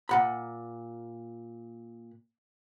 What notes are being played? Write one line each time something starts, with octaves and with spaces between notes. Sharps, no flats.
A#2 F#5 B5